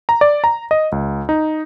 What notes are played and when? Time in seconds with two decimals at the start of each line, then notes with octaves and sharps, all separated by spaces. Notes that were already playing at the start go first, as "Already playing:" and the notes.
0.09 A#5
0.21 D5
0.44 A#5
0.71 D#5
0.92 C#2
1.29 D#4